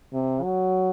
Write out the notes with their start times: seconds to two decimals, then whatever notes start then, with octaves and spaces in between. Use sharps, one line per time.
0.13 C3
0.43 F#3